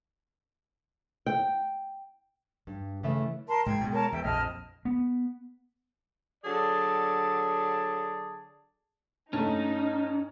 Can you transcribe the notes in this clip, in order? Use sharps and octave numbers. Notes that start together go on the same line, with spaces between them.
G5
G2
C#3 E3 A3 B4 E5
A#4 A5 C6
G#2 G5 G#6
B2 G#3
A#4 C#5 A5
E2 E5 G5
A#1 F2 D#5 A5 F6
B3
D3 F#3 G#4 D5 A5
G2 A3 C#4 D#4